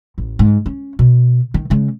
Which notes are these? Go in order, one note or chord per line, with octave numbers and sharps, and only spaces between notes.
A1
G#2
C#4
B2
D#3
C#3 G#3